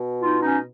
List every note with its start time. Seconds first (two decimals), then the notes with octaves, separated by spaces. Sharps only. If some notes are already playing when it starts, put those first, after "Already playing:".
Already playing: B2
0.21 D#4 F4
0.42 C#4 D#4